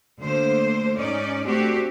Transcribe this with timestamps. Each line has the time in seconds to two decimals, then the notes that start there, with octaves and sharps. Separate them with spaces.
0.20 D2 D3 A#3 C5
0.97 G#2 C#4 D#4 D5
1.44 A3 C4 D4 F#4 G4